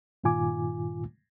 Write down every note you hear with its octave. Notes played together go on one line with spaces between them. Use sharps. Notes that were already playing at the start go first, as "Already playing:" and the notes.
G2 A#2 D#3 F4 G#5 D6